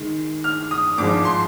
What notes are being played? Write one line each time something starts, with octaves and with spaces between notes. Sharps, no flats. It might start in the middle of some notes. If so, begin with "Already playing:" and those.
Already playing: D#3 G#3
F6
D#6
G#1 G2 F3 G#3 D6
C6